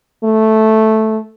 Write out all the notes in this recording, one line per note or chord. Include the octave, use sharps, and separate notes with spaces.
A3